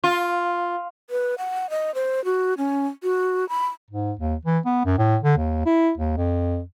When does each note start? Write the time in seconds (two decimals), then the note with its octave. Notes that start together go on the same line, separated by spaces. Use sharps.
0.04 F4
1.10 B4
1.38 F#5
1.70 D#5
1.95 C5
2.25 F#4
2.58 C#4
3.03 F#4
3.49 B5
3.91 G#2
4.19 D#2
4.45 E3
4.66 B3
4.86 F#2
4.98 A2
5.23 D3
5.38 D#2
5.66 E4
5.98 D#2
6.17 F2